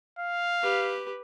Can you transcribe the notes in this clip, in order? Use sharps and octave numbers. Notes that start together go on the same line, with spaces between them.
F5
G4 B4